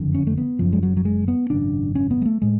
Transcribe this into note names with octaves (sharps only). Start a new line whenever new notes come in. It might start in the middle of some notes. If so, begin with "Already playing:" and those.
Already playing: F#1 F2 D3
C#4
A3
B3
F#1 F#2 C#3 F3
G#3
F#3
F#3
G#3
B3
G#1 F#2 C#3 D4
C#4
B3
G#3
A3
A2 G#3